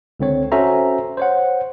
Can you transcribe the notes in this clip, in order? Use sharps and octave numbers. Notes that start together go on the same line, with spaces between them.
C#2 D3 C4 C#5
C#4 F#4 A4 C5 E5 A#5
C5 C#5 F#5